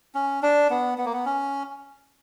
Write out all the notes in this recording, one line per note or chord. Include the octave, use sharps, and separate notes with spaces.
C#4
D4
B3
B3
A#3
B3
C#4